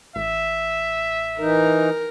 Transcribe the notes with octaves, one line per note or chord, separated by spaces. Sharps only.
A1 E5
E3 D#4 A#4